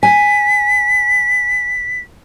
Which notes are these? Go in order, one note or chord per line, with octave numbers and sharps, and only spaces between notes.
G#5 B6